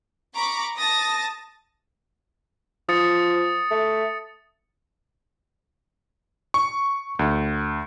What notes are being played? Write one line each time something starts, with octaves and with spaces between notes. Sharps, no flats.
A#5 B5 C#6 D6
A5 D#6 A6 A#6
F3 D#6 A6 C#7
A3
C#6
D2